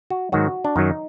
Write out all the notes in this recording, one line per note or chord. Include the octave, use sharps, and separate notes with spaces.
F#4
G#2 D#3 F#3 F#4
D4
F#2 D#3 F#3 D#4